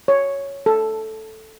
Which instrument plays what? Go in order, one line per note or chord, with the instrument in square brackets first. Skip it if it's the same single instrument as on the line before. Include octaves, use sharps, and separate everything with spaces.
[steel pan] C#5
A4